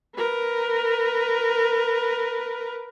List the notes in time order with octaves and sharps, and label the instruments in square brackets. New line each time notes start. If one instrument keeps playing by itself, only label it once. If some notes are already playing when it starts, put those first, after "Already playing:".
[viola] A#4 B4